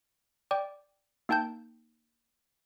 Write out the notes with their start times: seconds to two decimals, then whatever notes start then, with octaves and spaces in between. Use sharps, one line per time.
0.51 D5 G5 D6
1.29 A#3 D#4 G5 A5 G6